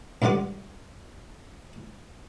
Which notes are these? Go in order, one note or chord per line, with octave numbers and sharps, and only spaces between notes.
C#2 G2 D3 F#5 D6